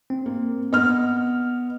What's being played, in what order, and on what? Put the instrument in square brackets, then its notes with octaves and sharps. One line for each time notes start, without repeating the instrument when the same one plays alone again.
[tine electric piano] C4
[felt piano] A#3
[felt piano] B3 F6 [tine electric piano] D#5